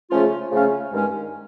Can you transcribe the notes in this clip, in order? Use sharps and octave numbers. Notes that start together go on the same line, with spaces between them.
C#3 F3 A3 C#4 F4
C#3 F3 A3 C#4 F4
G2 D#3 G#3 C#4